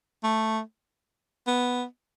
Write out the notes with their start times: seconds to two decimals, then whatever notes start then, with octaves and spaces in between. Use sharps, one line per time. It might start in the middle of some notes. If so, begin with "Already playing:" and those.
0.24 A3
1.47 B3